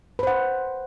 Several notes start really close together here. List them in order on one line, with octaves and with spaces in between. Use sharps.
B4 C5 F#5